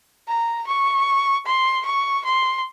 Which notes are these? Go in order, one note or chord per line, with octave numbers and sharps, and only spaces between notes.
A#5
C#6
C6
C#6
C6